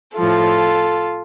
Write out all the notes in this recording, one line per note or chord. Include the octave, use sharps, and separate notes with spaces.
A2 F3 F4 A4